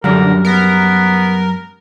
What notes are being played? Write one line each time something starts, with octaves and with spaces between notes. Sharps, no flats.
F#2 D3 G3 A#4
B3 A#4